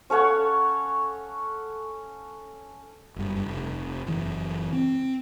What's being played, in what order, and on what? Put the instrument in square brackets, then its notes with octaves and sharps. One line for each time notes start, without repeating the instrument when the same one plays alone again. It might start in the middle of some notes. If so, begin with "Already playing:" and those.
[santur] C#4 A4 C#5 F#5
[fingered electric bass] F#1 G2
F1
F#1 E3
C4